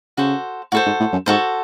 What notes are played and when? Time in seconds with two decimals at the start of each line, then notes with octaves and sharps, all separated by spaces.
0.17 C#3 F#4 A4 C5
0.72 A2 F#4 A4 C5
0.86 G#2
1.00 A2
1.13 F#2
1.26 G#2 F#4 A4 C5